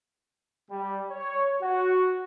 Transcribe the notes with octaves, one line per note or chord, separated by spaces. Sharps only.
G3
C#5
F#4